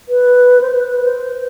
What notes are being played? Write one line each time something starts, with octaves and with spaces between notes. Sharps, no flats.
B4
C5
B4
C5